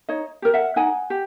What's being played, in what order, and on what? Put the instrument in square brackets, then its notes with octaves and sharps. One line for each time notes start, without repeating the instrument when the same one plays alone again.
[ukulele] D#4 C#5 D#5
G4 A#4
E5 F#5
D#4 F#5 G#5
G4